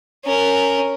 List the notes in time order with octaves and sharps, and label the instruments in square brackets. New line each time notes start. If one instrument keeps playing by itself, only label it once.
[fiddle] C#4 A#4